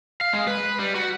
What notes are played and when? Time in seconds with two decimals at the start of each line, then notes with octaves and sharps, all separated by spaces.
0.21 F5
0.33 G#3
0.47 B4
0.79 G3
0.95 F#4